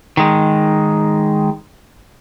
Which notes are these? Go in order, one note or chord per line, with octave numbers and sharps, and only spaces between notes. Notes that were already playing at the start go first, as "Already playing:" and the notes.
D#3 G#3